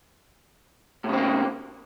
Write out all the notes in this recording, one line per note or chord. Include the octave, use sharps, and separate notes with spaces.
A2 C#3 A#3 C4